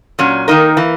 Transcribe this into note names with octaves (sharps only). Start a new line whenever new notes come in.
A#2 F#3 C#4
D#3 A#3 D#4 A#4
E3 A#3